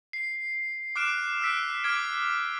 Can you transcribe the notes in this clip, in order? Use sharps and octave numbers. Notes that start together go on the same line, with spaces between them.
C7
D6 F6 F#6 D7 E7
E6 F#6 B6 D7
D6 F6 G#6 D7